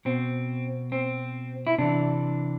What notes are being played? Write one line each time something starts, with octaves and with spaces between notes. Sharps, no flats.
B2 C4
C4
E4
C3 E3 D4